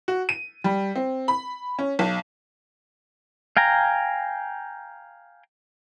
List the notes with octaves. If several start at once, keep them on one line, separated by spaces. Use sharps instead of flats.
F#4
D#7
G3
C4
B5
C#4
B1
F5 G5 G#5 A#5